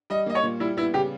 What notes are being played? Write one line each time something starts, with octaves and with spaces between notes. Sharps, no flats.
G3 D#5
A#3 D#5
C#5
A#2
G3 E4
B3 E4
C#3 G4